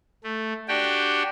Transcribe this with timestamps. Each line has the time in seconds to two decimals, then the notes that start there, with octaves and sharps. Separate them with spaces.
0.24 A3
0.68 D4 F#4 G4 G5